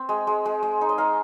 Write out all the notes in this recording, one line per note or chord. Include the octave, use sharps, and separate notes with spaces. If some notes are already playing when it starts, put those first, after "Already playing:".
Already playing: C4 C5
G#3
G#3
G#3
G#3
D#4
D#5
D#4 F5